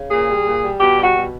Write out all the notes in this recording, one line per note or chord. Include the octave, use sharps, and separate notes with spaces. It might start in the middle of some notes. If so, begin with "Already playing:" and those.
Already playing: C#3
A#2 G#4
G3
A#2
G3
B2 G4
G3
F#4
B2